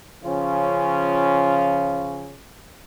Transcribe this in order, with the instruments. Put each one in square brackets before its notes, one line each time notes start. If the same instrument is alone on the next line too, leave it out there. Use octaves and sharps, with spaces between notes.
[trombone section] C#3 F3 C#4 F4